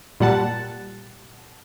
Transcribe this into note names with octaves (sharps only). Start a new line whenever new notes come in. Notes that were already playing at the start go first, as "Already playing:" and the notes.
A#2 G3 F#5 A5